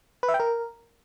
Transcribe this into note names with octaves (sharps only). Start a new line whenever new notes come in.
B4
E5
G5
A#4